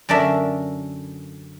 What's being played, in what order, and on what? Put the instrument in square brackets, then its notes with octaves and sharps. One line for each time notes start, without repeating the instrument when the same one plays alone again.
[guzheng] F#2 D3 D4 A#4 E5